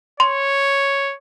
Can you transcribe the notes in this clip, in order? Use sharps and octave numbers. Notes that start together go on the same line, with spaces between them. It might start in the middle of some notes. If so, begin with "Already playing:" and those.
C#5 C6